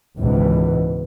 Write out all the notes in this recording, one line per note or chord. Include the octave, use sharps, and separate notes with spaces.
G#1 C#2 G#2 B2 E3